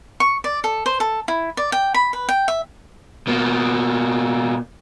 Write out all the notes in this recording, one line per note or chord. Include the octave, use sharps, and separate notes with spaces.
C#6
D5
A4
C5
A4
E4
D5
G5
B5
B4
G5
E5
B2 A#3